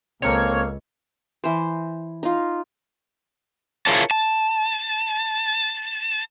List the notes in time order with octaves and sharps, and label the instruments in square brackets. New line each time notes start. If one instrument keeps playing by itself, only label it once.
[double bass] C#2 [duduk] A#3 [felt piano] C4 A4 A#4 [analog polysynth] C#5
[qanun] E3 C5
D#4 F4
[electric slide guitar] E4 F4 G#4 A#4 C#5 A5
A5